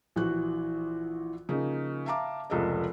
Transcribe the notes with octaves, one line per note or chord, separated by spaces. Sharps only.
A#1 E3 F#4 F#6
C#3 F3 A#3 D#4
E5 F5 A5 A#5 D6
F1 C#2 A4 A#4 D#5